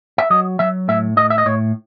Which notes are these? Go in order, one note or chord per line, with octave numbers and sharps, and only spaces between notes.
E5
F#3 D#5
F#3 E5
A2 E5
A2 D#5
E5
D#5
A2 C#5